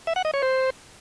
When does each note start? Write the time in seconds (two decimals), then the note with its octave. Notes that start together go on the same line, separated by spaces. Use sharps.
0.07 E5
0.16 F#5
0.25 D#5
0.34 C#5
0.42 C5